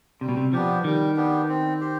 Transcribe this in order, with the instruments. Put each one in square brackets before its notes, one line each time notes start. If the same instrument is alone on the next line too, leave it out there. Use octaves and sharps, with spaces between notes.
[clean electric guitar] C3 [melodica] G3
[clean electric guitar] B2
C3
[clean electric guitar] F3 [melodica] B3 D4 G4
[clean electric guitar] D#3 [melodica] G3
[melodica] B3 D4 G4
C4
G4 C5